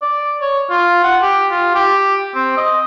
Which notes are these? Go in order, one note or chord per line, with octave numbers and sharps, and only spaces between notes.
D5
C#5
F4
F#5
G4
F4
G4
C4
D#5